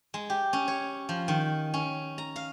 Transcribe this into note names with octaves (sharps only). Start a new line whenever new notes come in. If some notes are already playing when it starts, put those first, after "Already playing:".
G#3
G4
C#4
C#5
F3
D#3
C#4
A#5
F5